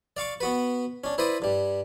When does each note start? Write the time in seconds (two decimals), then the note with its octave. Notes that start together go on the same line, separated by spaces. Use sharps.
0.17 D5 F5 C#6 D6
0.40 B3 F#4 B4
1.04 C#4 D4
1.18 E4 B4 C5 D5 D#6
1.42 G2 G3